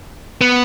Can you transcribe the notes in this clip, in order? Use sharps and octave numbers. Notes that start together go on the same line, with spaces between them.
B3